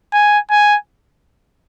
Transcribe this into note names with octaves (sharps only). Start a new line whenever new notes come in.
G#5
G#5